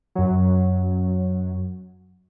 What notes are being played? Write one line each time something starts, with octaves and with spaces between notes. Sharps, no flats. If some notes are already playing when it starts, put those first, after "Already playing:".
F#2 F#3